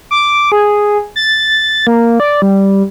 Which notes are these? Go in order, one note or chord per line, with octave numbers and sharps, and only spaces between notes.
D6
G#4
A6
A#3
D5
G3